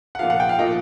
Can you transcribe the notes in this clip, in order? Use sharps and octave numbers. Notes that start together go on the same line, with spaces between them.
F#5
A#2 F3 F5
F#5
G5
F5
A#2 F3 D#5